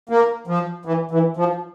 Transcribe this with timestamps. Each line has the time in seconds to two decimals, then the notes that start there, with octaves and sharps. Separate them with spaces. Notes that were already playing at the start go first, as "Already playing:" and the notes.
0.09 A#3
0.47 F3
0.85 E3
1.11 E3
1.37 F3